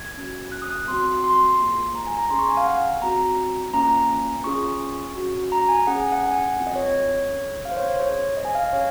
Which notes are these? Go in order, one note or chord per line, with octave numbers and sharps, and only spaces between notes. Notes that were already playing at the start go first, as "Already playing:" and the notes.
Already playing: G#6
C#4 F#4
F#6
D#6
F#6
C4 F#4 C6
C6
A#3 F4 G#4
A#5
G#5
A#5
C#4 G#4 C6
C#6
G#5
F5
F#5
C4 F#4 A#5
A#3 C#4 F4 A#5
C#4 F4 G#4 C#6
C#4 F#4
A#5
G#5
C#4 G#4 F#5
G#5
F#5
G#5
F#5
C4 F4 G#4
D#5
C#5
C#5
C#4 G#4
F5
C5
C#5
C5
G#4 C#5
C#4
D#5
G#5
F5
D#5
C#4 G#4 C#5